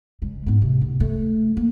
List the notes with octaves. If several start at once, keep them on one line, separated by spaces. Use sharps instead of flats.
C#3 G#3
G#2 B3
C3
D2
A3
A#3